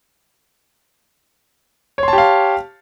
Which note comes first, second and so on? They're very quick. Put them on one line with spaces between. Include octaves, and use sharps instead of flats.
C#5 C6 A5 G4 F5